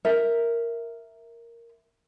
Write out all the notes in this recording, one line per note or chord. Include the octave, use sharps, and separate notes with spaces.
A#4 E5